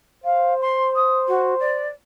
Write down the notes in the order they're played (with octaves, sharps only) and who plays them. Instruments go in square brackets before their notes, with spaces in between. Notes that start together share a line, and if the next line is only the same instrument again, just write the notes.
[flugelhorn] C5 [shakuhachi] F5
[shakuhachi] C6
D#6
F#4
D5